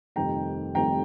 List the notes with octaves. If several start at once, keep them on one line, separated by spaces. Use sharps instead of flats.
F1 F2 D#3 G3 C4 G5 A#5
F1 F2 D#3 G3 C4 G5 A#5